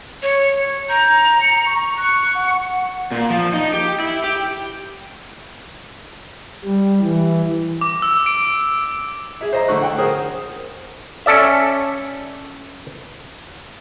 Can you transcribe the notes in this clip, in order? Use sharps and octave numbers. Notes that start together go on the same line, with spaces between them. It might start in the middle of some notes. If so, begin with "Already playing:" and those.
C#5
A#5 G6
C#7
C#6
C#6 F#6
F#5
A#2
F3
D#4
G4
E4
G4
G3
E3
D6
E6
D7
G#4 E5
C5 D#5 A#5
D3 A3 C#6 F#6
F#5 G5
G#4 A#4 C5 D#6
C#4 A4 D5 E5